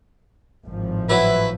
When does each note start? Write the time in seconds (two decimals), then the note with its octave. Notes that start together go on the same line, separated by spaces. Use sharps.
0.65 G#1 A2 F3
1.10 F#3 E4 B4